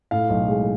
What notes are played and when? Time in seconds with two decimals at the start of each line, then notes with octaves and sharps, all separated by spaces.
0.11 A2 F5
0.30 B1
0.49 G#3